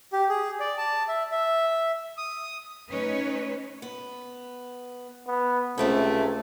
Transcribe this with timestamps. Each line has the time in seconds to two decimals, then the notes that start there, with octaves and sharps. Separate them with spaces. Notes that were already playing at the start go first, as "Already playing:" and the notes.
0.13 G4
0.29 G#4
0.60 D5
0.78 A5
1.08 E5
1.31 E5
2.17 D#6
2.88 A3 C#4 D#4 B4 C#5
3.82 B3
5.27 B3
5.78 C#2 C3 G#3 A3 C4 C#4